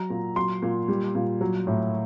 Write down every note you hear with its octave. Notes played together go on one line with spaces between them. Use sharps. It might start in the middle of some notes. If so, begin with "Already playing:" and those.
Already playing: F#3 A#5
A#2
F#3 C6
A#2
G3
A#2
F#3
A2